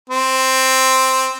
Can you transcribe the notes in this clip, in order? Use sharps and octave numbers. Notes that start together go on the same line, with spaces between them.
C4